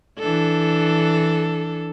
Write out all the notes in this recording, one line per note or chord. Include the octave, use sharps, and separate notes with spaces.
E3 D4 A4